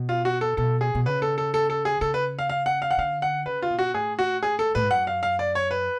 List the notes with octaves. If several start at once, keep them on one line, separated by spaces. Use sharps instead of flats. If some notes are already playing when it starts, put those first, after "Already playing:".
Already playing: B2
F4
F#4
A4
B2 A4
G#4
B2
C#3 B4
A4
A4
A4
A4
G#4
C#3 A4
B4
F5
F5
F#5
F5
F#5
D3 F5
F#5
C#3 B4
F4
B2
F#4
A2 G#4
F#4
G#4
A4
A2 B4
G#2
F#2 F#5
F5
F5
D5
C#5
B4